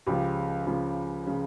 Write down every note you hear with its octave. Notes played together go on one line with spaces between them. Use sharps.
C#2 C#3 F3 G4
C#2 C#3 F3
C#3 F3